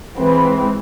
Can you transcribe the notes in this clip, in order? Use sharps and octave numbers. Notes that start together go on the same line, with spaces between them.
E3 G#3 C4 B4